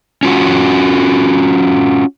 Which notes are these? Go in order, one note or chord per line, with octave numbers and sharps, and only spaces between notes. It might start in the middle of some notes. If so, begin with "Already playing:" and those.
C#4 F4 F#4